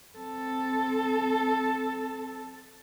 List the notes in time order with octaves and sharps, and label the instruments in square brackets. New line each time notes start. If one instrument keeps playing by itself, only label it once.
[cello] C4 A4